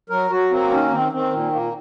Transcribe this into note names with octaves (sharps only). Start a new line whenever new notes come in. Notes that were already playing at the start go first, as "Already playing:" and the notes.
F#3 A#4
F#3 F#4
A#3 C4
D#3 C#4
D#3 C4
D#3 C4
A#2
A#2 A#3